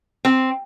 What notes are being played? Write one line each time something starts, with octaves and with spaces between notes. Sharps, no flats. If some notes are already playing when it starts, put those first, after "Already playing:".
C4